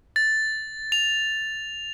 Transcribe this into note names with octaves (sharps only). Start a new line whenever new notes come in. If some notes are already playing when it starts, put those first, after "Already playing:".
A6
F7